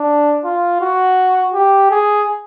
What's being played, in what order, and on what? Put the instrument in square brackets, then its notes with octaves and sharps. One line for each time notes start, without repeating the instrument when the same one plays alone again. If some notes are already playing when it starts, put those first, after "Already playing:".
Already playing: [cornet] D4
F4
F#4
G4
G#4